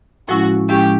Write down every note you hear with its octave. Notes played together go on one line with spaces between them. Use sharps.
A2 F3 G#3 C#4 E4 F#4
A2 F3 G#3 C#4 E4 G4